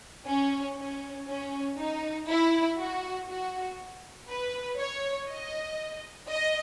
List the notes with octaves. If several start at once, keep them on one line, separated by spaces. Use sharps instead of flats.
C#4
C#4
C#4
D#4
E4
F#4
F#4
B4
C#5
D#5
D#5